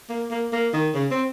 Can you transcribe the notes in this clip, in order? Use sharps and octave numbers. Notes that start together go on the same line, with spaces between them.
A#3
A#3
A#3
D#3
C#3
C4